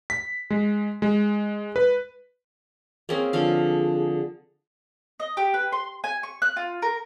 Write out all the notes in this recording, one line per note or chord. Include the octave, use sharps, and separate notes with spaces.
B6
G#3
G#3
B4
A#3 C4 C#4 G#4
D3 F3 F5
D#5
G4
B4
C6
G#5
C#6
F#6
F4
A#4